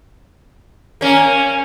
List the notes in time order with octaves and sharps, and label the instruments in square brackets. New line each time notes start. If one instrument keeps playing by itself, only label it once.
[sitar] A#3 C#4